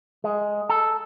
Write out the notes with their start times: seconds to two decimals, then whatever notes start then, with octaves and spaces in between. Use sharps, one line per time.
0.24 G#3
0.69 A4